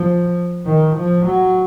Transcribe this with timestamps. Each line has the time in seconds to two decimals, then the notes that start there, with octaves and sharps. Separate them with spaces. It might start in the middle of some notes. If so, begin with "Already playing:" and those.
Already playing: F3
0.66 D#3
0.96 F3
1.26 F#3